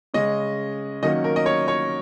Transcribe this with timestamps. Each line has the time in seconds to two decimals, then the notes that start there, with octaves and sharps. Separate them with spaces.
0.14 C#3 G#3 C#4 D#5
1.03 D#3 F#3 A#3 C#4 D#5
1.24 A#4
1.36 D#5
1.46 C#5
1.68 C#5